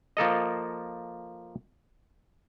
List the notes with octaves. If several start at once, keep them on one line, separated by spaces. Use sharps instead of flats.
F3 A#3 A4 D#5